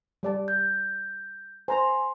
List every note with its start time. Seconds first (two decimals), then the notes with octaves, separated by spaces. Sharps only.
0.23 G3 D5 A5
0.48 G6
1.68 C5 G#5 A#5 C6